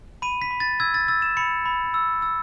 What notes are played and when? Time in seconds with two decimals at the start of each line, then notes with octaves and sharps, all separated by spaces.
0.22 B5 D#7
0.42 B6
0.51 B5
0.60 A6
0.80 E6 G#6
0.94 A6
1.08 E6 A6
1.22 E7
1.37 B5 C#7
1.65 B5
1.94 E6
2.22 E6